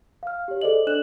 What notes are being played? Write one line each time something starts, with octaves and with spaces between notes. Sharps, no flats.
F5 F6
G4 C#5
G#4 A4 C5 D5 D#5 F#7
D4 A4 D5 F#6 E7 F#7